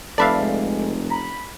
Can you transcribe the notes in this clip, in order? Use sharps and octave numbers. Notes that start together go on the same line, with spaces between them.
F1 A4 B4 D5 E5 F5
G#3
A#5 B5